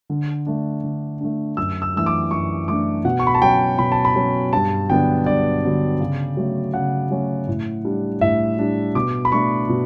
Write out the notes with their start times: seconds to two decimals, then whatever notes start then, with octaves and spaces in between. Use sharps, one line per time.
0.10 D3
0.47 A3 D4
0.84 D3
1.21 A3 D4
1.57 F#2 E6
1.82 E6
1.94 E3 A3 D4 E6
2.06 D6
2.31 F#2 C#6
2.68 E3 A3 D4 D6
3.05 B2 F#5
3.19 C#6
3.27 B5
3.35 A5
3.42 F#3 C#4 G5
3.79 B2 B5
3.92 A5
4.05 B5
4.16 F#3 C#4
4.53 G2 A5
4.89 D3 F#3 B3 D4 G5
5.26 G2 D5
5.64 D3 F#3 B3 D4
6.00 C#3
6.37 F#3 A3 C#4
6.74 C#3 F#5
7.11 F#3 A3 C#4
7.48 A2
7.85 G3 D4
8.21 A2 E5
8.58 G3 D4
8.95 B2 D6
9.25 B5
9.32 A3 D4 C#6
9.69 B2